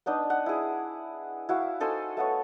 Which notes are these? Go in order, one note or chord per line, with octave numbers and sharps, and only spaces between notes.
B3 D4 D#4 D#5
F#5
E4 G#4
E4 F#4 F5
D#4 A4 C5 G#5
A3 B3 C#5